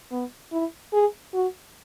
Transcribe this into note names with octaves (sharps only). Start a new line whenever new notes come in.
B3
E4
G#4
F#4